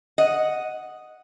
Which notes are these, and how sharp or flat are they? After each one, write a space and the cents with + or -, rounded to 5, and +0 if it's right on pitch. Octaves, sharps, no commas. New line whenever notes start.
D#5 +0 F#5 +0